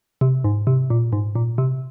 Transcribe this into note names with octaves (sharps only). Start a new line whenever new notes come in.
C3
G#2
C3
A#2
G#2
A#2
C3